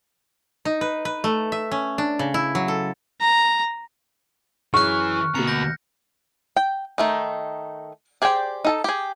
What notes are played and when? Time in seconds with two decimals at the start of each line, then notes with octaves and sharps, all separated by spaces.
0.65 D#4
0.81 B4
1.05 B4
1.24 A3
1.52 E5
1.71 C#4
1.98 D4
2.19 C#3
2.34 E4
2.55 F#3
2.68 A4
3.21 A#5
4.74 F#2 E3 G#4 C#6 F6 F#6
5.35 D2 B2 A#3 B3 A#5 C#7
5.48 G6 A#6
6.56 G5
6.98 D#3 A3 D#4
8.22 G4 G#4 C5 D5 G5
8.64 D#4 A4 A5
8.84 G4 G#4